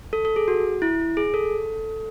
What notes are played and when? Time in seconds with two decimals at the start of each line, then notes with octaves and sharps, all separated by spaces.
0.13 A4
0.25 A4
0.36 G#4
0.48 F#4
0.82 E4
1.17 G#4
1.34 A4